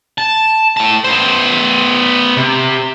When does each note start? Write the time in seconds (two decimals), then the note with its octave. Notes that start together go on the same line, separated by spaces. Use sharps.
0.18 A5
0.77 A2 A5
1.04 B3 C5
2.37 C3